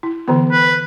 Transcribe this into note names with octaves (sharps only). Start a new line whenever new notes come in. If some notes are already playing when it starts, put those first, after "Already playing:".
E4
D3 E3 B3
B4